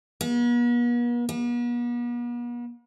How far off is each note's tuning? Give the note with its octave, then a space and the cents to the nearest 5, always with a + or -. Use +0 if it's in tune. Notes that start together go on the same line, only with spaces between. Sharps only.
B3 -45
B3 -45